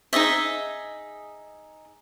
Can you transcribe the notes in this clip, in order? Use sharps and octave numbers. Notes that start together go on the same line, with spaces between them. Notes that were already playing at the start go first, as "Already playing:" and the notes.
D#4 G#4 D#5 E5